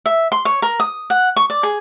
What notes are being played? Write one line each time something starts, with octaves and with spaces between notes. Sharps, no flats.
E5
C6
C#5
A#4
D#6
F#5
C#6
D5
G#4